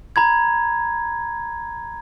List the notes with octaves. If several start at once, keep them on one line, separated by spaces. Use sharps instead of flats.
A#5 B5 G#6